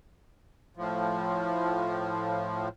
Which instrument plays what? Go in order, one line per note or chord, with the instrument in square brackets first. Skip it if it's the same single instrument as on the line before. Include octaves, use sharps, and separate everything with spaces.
[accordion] A2 F3